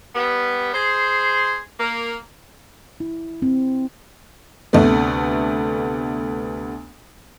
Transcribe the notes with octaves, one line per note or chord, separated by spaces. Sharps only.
G3 B3
G#4 C5
A#3
E4
C4
D2 C3 A3 B3